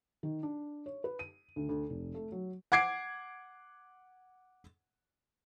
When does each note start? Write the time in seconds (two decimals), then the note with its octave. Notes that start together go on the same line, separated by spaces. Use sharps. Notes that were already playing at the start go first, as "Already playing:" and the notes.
0.23 D#3
0.43 D4
0.86 C#5
1.04 B4
1.19 D#7
1.56 D2
1.69 D2
1.90 F1
2.14 A3
2.32 F#3
2.72 F#5 D6 G#6 C7 D7